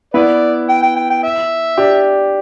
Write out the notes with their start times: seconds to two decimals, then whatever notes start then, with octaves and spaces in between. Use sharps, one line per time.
0.14 B3 E4 B4 D5
0.69 G5
0.83 G5
0.96 G5
1.10 G5
1.23 E5
1.77 D4 G4